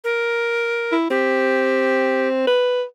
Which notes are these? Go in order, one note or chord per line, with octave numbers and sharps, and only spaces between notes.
A#4
E4
C4 G4
B4